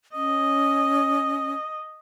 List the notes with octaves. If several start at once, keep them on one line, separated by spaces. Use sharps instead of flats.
C#4 D#5